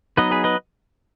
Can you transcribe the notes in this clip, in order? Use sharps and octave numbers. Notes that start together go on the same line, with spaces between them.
F#3 B3 D#4 B4 D#5
G#4 B4
B4 D#5